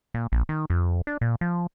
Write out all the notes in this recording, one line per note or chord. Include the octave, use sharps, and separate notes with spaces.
A#2
A#1
D#3
F2
D4
A#2
F3